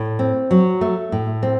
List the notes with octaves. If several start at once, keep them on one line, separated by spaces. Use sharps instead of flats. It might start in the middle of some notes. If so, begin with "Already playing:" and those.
Already playing: A2
C4
F#3
A3
A2
C4